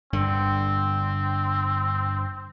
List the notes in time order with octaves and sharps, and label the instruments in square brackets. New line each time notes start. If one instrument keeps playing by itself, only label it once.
[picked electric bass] G1 G2 D3 [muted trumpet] C4